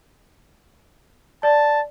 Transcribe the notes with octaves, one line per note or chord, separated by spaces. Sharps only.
D5 A5